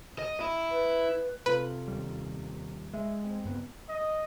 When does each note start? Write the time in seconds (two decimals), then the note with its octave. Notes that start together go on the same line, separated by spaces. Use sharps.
0.19 D#5
0.41 E4
0.71 B4
1.46 C3 F4 A4 B4
1.88 D#2 G3
2.94 G#3 E5
3.24 C4
3.44 F#1 G2 B3
3.89 D#5